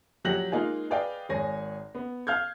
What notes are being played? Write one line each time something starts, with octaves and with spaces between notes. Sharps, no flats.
A#1 F#3 G4 F#6 A#6 F#7
G#3 A#3 D#4 F4 G#4
G#4 B4 D5 D#5 F5 G5
G#1 G#4 C#5 G#5 A#6
B3
F5 F6 G6 G#6